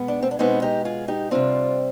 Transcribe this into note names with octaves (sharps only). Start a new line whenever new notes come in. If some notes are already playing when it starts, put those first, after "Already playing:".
Already playing: B2 G#3 B3
D4
C4
D4
B2 G#3 B3 C4 D#4
D#4 G4
F4 G#4
D#4 G4
C3 G3 C4 D4 F4